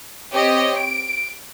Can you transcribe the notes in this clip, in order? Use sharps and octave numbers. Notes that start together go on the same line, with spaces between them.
C4 G4 C#5 D#5
D7